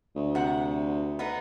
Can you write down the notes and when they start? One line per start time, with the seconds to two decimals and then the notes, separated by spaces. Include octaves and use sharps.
0.16 D2
0.35 C3 F#5
1.19 B3 D#4